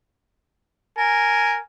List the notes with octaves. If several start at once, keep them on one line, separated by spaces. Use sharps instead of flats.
A#4 G#5